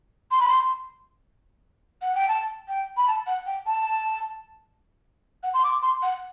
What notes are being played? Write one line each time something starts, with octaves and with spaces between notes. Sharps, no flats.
C6
B5
C6
F#5
G5
A5
G5
B5
A5
F#5
G5
A5
F#5
C6
D6
C6
F#5